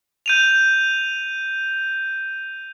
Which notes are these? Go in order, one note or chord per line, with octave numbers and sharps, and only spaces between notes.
G6 D#7 F7